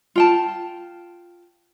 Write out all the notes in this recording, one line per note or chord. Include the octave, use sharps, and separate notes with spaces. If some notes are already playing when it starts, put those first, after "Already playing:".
F4 G5 A5